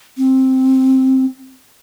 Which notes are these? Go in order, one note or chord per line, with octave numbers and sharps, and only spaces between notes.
C4